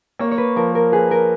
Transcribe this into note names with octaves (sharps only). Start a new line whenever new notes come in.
A#3 C#5
C#5
B4
F3 A#4
A#4
G#4 B4
A#4